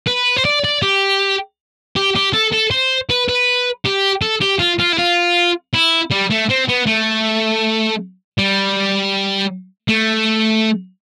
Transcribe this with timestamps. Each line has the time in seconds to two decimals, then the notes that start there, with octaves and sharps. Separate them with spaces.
0.07 B4
0.37 C5
0.45 D5
0.64 D5
0.82 G4
1.96 G4
2.15 G4
2.33 A4
2.53 A4
2.71 C5
3.10 B4
3.29 B4
3.85 G4
4.22 A4
4.42 G4
4.60 F4
4.79 F4
4.93 E4
4.98 F4
5.74 E4
6.11 G3
6.30 A3
6.49 C4
6.68 B3
6.87 A3
8.38 G3
9.89 A3